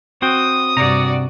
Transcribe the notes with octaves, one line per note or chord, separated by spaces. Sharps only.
C4 F#4 G5 D#6
G2 C3 F#4 D5 A#5